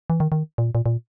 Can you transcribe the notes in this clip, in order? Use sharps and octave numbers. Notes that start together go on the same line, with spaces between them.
E3
D#3
D#3
A#2
A#2
A#2